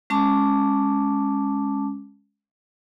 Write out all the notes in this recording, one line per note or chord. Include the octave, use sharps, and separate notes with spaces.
G#3 C#4 A5 D6